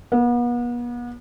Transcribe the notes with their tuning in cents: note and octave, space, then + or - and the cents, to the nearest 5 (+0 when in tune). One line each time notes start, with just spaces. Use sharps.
B3 -40